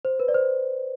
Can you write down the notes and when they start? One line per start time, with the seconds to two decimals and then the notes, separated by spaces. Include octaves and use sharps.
0.05 C5
0.20 B4
0.28 D5
0.34 C5